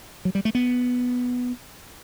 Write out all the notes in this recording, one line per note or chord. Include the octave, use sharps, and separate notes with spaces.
F#3
G3
A3
B3